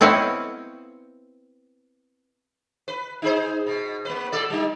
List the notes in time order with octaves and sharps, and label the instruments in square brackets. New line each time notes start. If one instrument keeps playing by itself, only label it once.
[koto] B3 C4 E4 C#5 D#5 F5
[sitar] B4
D#4 G#4 C5
B2
A#3 B4
B2 A4 D5
G3 D#4